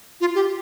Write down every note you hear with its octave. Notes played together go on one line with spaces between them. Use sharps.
F4
G4